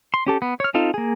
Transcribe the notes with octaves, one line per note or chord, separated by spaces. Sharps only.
C6
C#4 G4 A4
B3
C#5 F6
C4 D#4 F4 A4
A#3 G#4